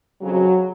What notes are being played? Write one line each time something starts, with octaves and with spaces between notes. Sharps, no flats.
F2 C#3 F#3